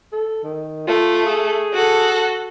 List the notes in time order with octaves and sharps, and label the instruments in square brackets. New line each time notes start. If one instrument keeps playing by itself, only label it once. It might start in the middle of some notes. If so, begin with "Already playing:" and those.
[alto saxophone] A4
D#3
[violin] A3 [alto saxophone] F4
[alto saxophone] G#4
[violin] F#4 A4